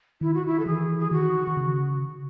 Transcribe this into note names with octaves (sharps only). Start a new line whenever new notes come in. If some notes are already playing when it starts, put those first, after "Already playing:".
D#3 E4
F#4
E4
A4
E3 G#4
G#4
D#3 F#4
D#3
C#3